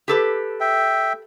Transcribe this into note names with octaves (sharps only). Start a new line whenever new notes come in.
G4 A4 B4
E5 G5